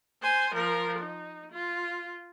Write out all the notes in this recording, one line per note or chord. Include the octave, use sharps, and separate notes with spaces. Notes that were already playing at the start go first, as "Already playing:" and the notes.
C5 G#5
F3 A#4
D#4
F4